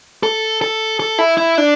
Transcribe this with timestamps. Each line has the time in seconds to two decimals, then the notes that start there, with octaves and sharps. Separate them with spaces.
0.23 A4
0.62 A4
1.00 A4
1.18 E4
1.38 E4
1.58 D4